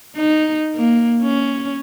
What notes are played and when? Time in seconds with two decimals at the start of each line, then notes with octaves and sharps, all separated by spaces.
0.16 D#4
0.75 A#3
1.22 C#4